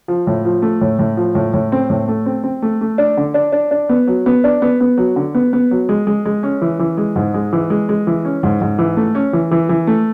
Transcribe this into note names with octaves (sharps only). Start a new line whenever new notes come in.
F3
A2
F3
A3
A2
A2
F3
A2
A2
C4
A2
A3
C4
C4
A3
A3
D4
D3
D4
D4
D4
B3
F#3
B3
D4
B3
B3
F#3
D3
B3
B3
F#3
G#3
G#3
G#3
C#4
E3
E3
G#3
G#2
G#3
E3
G#3
G#3
E3
C#4
G#2
G#2
E3
A3
C#4
E3
E3
E3
A3